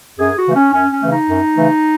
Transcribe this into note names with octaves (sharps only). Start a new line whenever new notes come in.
F#2 G#4
F#4
C#3 E3 A3
C#4
F#2 C#4
C#4
C#3 E3 A3
D#4
F#2
C#3 E3 A3